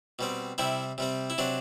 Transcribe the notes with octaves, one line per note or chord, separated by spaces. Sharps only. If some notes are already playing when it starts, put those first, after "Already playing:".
B2 G3 C4
C3 G3 C4 E4
C3 G3 C4
E4
C3 F#3 C4 D4